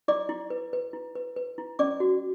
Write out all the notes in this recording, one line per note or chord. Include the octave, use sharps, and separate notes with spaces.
E4 D5 D6
E4
B4
B4
E4
B4
B4
E4
C#4 D5 D6
F#4